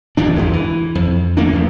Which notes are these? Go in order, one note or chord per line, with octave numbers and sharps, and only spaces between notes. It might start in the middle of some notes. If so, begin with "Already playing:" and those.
F#1 F2 E3 D4
F#1 E2 G#3
E3
F2
A3 A#3 C#4 D4
E2 F3